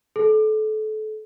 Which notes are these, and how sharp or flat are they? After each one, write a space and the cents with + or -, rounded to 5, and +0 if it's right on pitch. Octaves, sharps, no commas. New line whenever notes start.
A4 -30